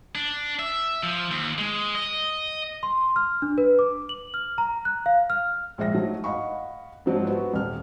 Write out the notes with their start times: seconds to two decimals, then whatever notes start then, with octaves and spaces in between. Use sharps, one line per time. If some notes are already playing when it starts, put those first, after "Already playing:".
0.15 D4
0.59 E5
1.03 F3
1.31 D#2
1.58 G#3
1.95 D#5
2.83 C6
3.16 F6
3.42 D4
3.58 B4
3.79 D6
4.09 F#7
4.34 F6
4.58 A#5
4.85 F#6
5.06 F5
5.30 F6
5.78 A#1 G#3 E5 A#6
5.94 F#3 A3 D#4
6.24 D#5 F5 F#5 B5 C#6
7.06 G#2 F3 F#3 C4 D4
7.27 B3 F#4 G4
7.54 D#1 F6